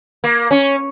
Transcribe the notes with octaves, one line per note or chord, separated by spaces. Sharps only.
A#3
C#4